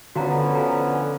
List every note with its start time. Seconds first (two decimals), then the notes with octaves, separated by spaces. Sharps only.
0.15 D3 F3 B3 C#4 F#4 F5 A#5
0.55 F5 G#5 A#5